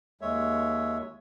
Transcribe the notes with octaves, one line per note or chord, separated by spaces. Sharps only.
D#2 G#3 C#5 E5